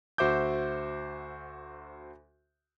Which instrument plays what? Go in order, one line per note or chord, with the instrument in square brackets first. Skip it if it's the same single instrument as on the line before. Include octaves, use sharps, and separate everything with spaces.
[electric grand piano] D2 F#4 C5 E5 D6 G6